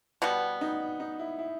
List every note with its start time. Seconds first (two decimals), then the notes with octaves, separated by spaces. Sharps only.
0.22 B2 G3 B3
0.61 D#4
1.00 D#4
1.19 E4
1.39 E4